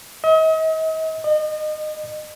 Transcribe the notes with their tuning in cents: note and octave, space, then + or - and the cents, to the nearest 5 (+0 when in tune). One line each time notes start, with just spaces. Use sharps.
D#5 +40
D#5 -35